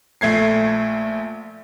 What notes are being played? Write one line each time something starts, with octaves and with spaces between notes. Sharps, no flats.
A#1 A3 G#6 C7